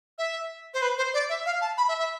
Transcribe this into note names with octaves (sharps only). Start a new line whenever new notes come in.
E5
C5
B4
C5
D5
E5
F5
A5
B5
E5
E5